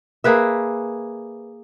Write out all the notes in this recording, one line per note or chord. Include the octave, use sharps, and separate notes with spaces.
A#3 G#4 B4 E5